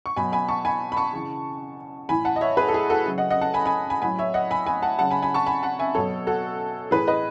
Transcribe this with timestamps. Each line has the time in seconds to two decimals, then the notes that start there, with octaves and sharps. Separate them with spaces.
0.06 C#6
0.16 B2 F#3 G#5 B5
0.33 G#5 B5
0.48 A5 C#6
0.65 G#5 B5
0.92 B5
0.97 A5 C#6
1.13 C#3 E3
2.09 A2 E3 G#5 B5
2.25 F#5 A5
2.36 D#5
2.41 C#5 E5
2.57 G#4 B4
2.68 A4
2.74 G#4
2.90 F#4 A4
3.06 C#3 F#3
3.18 D#5 F#5
3.31 D#5 F#5
3.41 F#5 A5
3.54 G#5 B5
3.66 G#5 B5
3.90 G#5 B5
4.02 A2 F#3 G#5 B5
4.18 C#5 E5
4.34 D#5 F#5
4.51 G#5 B5
4.67 G#5 B5
4.82 F#5 A5
4.99 C#3 F#3 F#5 A5
5.10 G#5 B5
5.22 G#5 B5
5.34 A5 C#6
5.46 G#5 B5
5.63 F#5 A5
5.79 E5 G#5
5.95 B2 F#3 A4 C#5
6.27 F#4 A4
6.91 A2 E3 G#4 B4
7.08 B4 D#5